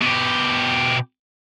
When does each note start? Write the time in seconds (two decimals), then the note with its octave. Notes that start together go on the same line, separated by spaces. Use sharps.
0.02 B2 G4